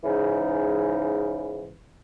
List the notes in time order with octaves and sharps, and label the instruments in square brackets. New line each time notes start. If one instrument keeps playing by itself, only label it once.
[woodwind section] G#2 C#3 E3 D#4